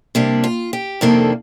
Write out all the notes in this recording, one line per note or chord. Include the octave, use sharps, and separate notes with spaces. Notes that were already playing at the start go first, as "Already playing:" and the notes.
C3 G3 A#3 D4
F4
G4
F2 C3 D#3 A#3 D4 A4